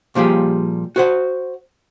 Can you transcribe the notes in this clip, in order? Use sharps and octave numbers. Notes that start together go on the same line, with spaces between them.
A#2 F3 G3 G4 G#4
F#4 C5 F#5